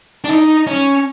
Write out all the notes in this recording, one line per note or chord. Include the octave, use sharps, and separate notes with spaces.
D4
D#4
C#4